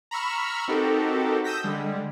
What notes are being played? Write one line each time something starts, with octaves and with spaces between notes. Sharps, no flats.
A#5 B5 C#6 E6 F6
C4 D#4 F#4 G4 A4 A#4
D#6 E6 G6 A#6 B6
D3 G3 G#3